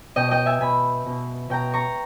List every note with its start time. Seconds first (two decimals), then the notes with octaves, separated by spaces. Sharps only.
0.16 B2 D#5 G5
0.31 D#5 G5
0.46 E5 G#5
0.61 B2 G#5 B5
1.06 B2
1.50 B2 G5 A#5
1.73 A#5 C#6